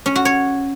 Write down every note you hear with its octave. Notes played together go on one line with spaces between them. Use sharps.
C#4
F#4
C#5